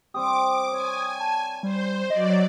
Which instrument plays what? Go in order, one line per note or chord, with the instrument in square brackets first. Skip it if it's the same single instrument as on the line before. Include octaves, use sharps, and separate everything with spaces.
[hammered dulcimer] G3 C4 G4 [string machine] D6 [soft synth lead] D#6
[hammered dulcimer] C#5 [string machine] G#5
[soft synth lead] A5
[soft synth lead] G3 [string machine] C5
[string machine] F#3 D5 [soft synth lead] D#5